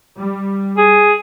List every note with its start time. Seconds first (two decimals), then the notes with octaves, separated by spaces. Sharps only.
0.18 G3
0.77 G#4